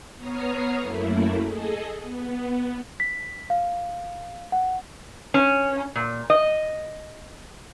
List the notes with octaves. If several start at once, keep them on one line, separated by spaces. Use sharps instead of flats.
B3 C#5 A#5 D#6 F6 C7
F#2 A3 A#3 E4
G#4 A4 D#5
B3
B6
F5
F#5
C#4
A#2
D#5